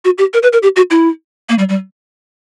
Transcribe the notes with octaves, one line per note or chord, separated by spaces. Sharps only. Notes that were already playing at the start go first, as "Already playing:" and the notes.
F#4
G4
A#4
B4
A#4
G4
F#4
E4
A#3
G3
G3